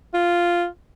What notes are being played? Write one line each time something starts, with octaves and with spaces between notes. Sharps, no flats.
F4